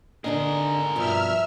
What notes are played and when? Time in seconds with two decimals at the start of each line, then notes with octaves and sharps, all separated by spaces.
0.24 D3 D4 G#4 A#4 D#5
0.96 G2 B2 F3 E5 E6 F6